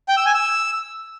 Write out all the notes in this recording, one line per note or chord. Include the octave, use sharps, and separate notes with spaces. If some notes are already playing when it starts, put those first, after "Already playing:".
G5
E6
G#5
E6